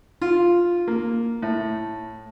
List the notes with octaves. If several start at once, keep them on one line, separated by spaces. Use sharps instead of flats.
F4
A#3
A2